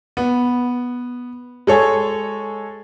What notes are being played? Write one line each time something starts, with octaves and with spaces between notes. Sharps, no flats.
B3
G#3 A4 C#5 G#5